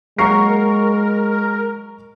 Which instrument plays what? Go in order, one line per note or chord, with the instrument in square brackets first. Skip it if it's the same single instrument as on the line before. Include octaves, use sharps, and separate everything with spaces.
[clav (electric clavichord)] F#3 A#3 [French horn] G#3 [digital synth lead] A#4 [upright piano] A#5 C#6 C7